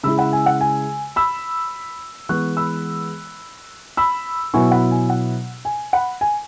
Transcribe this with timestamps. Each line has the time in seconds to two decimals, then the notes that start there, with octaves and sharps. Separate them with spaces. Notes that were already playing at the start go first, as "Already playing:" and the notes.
0.03 C#3 G#3 E4 B5 E6
0.18 F#5 B5
0.33 G#5
0.46 F#5
0.61 G#5
1.16 B5 E6
2.29 E3 G#3 B3 C#6 F#6
2.57 B5 E6
3.97 B5 E6
4.53 B2 F#3 B3 E4 G#5 C#6
4.71 F#5 B5
4.91 G#5
5.10 F#5
5.65 G#5
5.93 F#5 B5
6.21 G#5